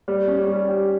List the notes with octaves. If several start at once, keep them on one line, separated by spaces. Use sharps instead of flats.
G3
C#4
G3
G4